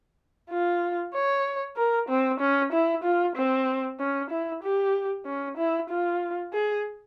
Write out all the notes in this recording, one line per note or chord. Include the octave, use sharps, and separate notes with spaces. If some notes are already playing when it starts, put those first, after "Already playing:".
F4
C#5
A#4
C4
C#4
E4
F4
C4
C#4
E4
G4
C#4
E4
F4
G#4